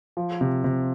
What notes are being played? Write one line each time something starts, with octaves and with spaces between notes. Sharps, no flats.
F3
C3
C3